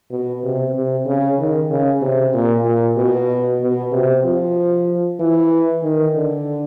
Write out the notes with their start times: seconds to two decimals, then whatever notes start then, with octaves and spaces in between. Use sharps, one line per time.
0.11 B2
0.43 C3
0.75 C3
1.06 C#3
1.39 D#3
1.70 C#3
2.01 C3
2.34 A#2
2.65 A#2
2.97 B2
3.61 B2
3.92 C3
4.24 F3
5.20 E3
5.83 D#3
6.15 D3